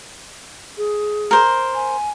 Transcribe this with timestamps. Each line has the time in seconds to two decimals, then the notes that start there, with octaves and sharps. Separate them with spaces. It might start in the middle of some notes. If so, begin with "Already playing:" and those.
0.78 G#4
1.31 A#4 C5
1.75 G#5